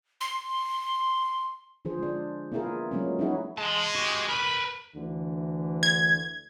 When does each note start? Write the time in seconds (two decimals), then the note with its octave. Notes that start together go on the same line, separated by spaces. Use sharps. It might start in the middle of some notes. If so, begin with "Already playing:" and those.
0.21 C6
1.85 D3 F3 G#4 C5
1.99 G#3 D4
2.52 A#3 B3 E4 F4 G#4 A#4
2.91 F3 F#3 G#3 A#3 B3 C#4
3.19 F#3 C#4 D#4 E4 F#4 G#4
3.58 G#3 A5 C6
3.95 F#4 G4
4.29 A#4 B4 B5
4.96 D2 D3 E3
5.83 G#6